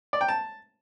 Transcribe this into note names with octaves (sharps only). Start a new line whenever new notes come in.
D5
G5
A5